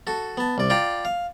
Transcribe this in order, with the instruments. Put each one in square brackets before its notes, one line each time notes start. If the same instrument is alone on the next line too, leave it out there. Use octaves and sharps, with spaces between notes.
[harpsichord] F#4 A4
B3 A5
C2 D5
F4 D5 G5 A#5 C6
F5